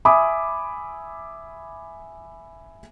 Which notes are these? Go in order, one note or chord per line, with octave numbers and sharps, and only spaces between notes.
E5 G#5 B5 D6 D#6